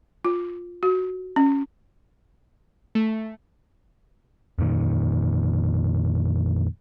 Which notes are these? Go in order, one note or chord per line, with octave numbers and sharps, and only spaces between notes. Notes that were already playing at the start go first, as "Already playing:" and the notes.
F4
F#4
C#4
A3
F2 A#2 D#3